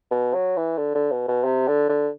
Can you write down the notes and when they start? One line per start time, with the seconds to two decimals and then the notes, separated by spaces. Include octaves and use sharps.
0.11 B2
0.34 F#3
0.57 E3
0.78 D3
0.95 D3
1.11 B2
1.28 B2
1.44 C3
1.67 D3
1.89 D3